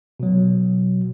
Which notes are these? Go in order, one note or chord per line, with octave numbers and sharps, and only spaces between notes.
B2 F#3